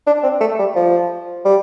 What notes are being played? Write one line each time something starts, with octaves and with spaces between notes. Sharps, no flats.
D4
C4
A3
G3
F3
G3